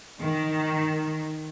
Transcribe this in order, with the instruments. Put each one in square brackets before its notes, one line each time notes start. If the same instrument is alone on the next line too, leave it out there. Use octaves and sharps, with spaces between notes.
[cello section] D#3